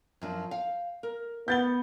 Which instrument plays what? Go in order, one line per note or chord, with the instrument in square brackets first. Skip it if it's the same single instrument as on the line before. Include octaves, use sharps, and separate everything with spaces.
[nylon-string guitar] F#2 F3 D4
F5 G5
A#4
[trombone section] B3 [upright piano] G6 A6 G7